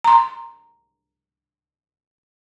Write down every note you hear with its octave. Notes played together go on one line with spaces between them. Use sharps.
A#5 C6